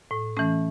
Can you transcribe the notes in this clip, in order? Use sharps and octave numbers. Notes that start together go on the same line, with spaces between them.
A2
E3 A3 C#4